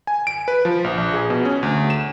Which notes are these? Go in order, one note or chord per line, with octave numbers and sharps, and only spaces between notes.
G#5
D7
B4
F3
A#1
A#1
G#4
B2
C#4
D2
E7